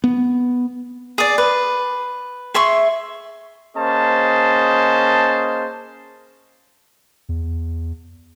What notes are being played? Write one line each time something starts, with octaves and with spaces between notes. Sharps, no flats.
B3
G#4 D5
B4
G#4 E5 C6 C#6
A#3 C#4 G#4 C5 D#5 A5
E2